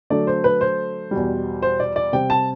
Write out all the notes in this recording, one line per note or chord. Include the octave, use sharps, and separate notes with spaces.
D3 F#3 A3 D5
C5
B4
C5
E2 B2 G3
C5
D5
D5
C3 G3 C4 G5
A5